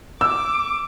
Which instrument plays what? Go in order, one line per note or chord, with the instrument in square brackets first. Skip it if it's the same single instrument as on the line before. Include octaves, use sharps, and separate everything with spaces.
[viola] D6 [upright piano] E6